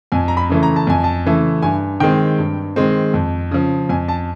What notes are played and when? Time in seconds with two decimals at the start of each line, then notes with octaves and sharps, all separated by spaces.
0.12 F2 G#5
0.28 A#5
0.37 B5
0.49 C#3 E3 A3
0.63 A#5
0.76 A5
0.87 F2 G#5
1.04 A5
1.26 C#3 E3 A3
1.63 G2 G#5
2.00 D#3 G#3 C4 G5
2.39 G2
2.76 D#3 G#3 C4
3.14 F2
3.51 C#3 F3
3.89 F2 G#5
4.08 A5